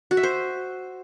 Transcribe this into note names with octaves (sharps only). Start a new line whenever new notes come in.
F#4
E5
C5